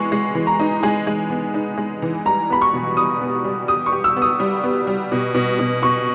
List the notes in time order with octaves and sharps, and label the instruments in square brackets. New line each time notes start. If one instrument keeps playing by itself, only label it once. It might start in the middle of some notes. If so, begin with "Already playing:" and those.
Already playing: [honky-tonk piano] E3 G#3 B3 [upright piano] C#6
[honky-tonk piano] G#3
E3
[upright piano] A#5
[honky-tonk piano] D#4
[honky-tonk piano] G#3 [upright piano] G#5
[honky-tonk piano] G#3
B3
D#4
G#3
E3
[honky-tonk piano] G3 [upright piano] A#5
[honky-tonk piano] B3 [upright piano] B5
[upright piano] C#6
[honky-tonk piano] B2
[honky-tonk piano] G3 [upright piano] D#6
[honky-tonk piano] B3
G3
[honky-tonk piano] G4 [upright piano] D#6
[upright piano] C#6
[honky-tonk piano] G4
[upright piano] E6
[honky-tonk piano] B3
[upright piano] D#6
[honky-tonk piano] G3
B3
G3
B2
B2
B2
[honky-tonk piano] B2 [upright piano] C#6